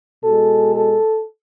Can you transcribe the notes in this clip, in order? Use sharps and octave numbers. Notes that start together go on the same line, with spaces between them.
B2 G#3 A4
A4